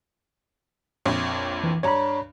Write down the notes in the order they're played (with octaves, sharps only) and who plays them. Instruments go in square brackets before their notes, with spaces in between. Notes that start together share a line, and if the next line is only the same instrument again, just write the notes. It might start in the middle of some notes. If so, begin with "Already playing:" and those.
[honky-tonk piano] A#1 F2 C#5
[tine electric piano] E3
[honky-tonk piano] G2 D4 [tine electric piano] C#5 A#5 B5